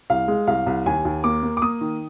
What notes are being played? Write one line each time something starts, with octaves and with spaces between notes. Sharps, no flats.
C2 F5
G#3
C2 F5
C2
D#2 G#5
D#2
A#3 D6
A#3
D6
A#3 D#6
D#3